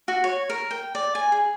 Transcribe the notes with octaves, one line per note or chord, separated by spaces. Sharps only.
F#4
C#5
A#4
G5
D5
G#5
G#4